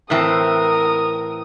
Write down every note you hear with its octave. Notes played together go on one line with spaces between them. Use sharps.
A2 E3 C4 A#4 D#6